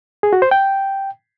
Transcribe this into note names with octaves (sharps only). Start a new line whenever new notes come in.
G#4
F#4
C5
G5